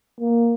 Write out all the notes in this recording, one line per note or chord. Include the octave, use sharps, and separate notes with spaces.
A#3